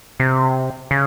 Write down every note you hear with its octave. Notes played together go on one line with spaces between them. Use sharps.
C3
C#3